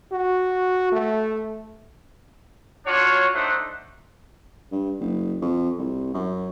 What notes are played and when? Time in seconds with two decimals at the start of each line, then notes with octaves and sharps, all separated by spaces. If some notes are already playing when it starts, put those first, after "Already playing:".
0.12 F#4
0.92 A3
2.87 D4 F4 F#4 C#5
3.34 A3 D4 D#4 C5 F#5
4.72 G2
5.00 F#1
5.42 F2
5.78 C2
6.14 F#2